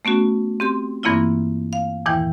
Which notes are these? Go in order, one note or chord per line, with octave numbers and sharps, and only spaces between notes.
A3 B3 C#4 F#4
C4 G4 C6
G2 E3 A#3 C4 E4 F4
F5
E2 A#2 D#3 E3 E4 G5